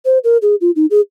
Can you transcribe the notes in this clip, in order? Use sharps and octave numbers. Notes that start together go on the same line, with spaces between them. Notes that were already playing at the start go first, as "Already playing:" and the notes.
C5
A#4
G#4
F4
D#4
G#4